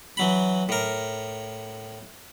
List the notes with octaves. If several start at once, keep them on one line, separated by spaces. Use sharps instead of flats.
E3 F#3 B5
A2 A#4